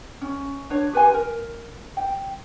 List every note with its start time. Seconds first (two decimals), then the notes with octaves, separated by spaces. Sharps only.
0.22 C#4
0.70 D4 C#5
0.93 G4 B4 C5 G#5
1.14 A#4
1.97 G5